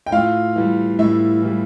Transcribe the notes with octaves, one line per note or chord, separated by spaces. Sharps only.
G5
A2 F4 F5
E3 G3
A2 E4 E5
E3 G3